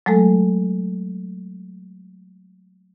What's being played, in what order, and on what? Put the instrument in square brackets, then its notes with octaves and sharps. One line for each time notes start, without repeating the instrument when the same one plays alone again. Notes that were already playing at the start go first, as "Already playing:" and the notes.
[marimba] F#3 G#3 A3 A4